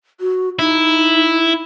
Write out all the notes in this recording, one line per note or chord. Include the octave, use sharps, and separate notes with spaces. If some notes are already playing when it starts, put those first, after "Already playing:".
F#4
D#4 E4